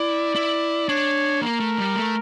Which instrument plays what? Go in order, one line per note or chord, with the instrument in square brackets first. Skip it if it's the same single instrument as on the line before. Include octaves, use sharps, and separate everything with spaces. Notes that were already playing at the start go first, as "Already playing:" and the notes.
Already playing: [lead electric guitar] E4 [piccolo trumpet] D5
[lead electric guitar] E4
[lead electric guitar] D4 [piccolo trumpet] C#5
[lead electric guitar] A#3 [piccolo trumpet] A#4
[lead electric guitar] A3
G3
A3